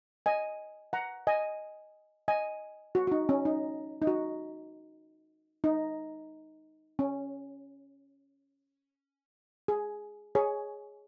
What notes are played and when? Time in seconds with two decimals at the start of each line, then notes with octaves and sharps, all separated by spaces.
0.26 D#5 G#5
0.93 F#5 A#5
1.27 D#5 G#5
2.28 D#5 G#5
2.95 F#4
3.07 F#4
3.12 D#4
3.29 C#4
3.45 D#4
4.02 D#4
4.07 F#4
5.64 D#4
6.99 C#4
9.68 G#4
10.35 G#4 C#5